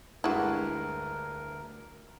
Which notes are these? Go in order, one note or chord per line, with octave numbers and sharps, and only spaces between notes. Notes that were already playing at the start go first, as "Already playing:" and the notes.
D2 G2 G#3 E4 F#4 A#4